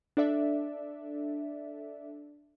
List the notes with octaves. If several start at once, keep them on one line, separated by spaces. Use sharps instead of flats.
D4 A4 D5 E5